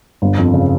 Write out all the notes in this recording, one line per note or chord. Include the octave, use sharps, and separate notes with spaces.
G1
F2
C#3